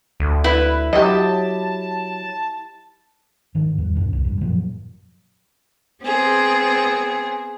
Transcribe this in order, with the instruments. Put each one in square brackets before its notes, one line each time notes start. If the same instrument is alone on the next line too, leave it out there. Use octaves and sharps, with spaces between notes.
[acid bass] D2
[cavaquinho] E4 [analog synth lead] B4
[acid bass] F#3 [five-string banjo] G4 D#5 [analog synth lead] A5
[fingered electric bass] G#2 D#3
E2 G3
D1 F#2 A#2
C2 F2
G2
F#2 A#2 F3 F#3
[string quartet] B3 C4 G#4